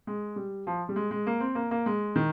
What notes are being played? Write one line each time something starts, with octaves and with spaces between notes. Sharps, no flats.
G#3
G3
F3
G3
G#3
G#3
A#3
C4
A#3
A#3
G#3
D#3